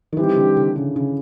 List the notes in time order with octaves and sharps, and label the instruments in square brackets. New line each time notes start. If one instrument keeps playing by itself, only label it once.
[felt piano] D#3
[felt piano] E3 [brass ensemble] G3 C4 D#4 G4
[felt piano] D3
D3
C#3
C#3